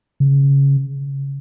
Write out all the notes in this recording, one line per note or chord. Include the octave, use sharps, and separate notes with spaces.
C#3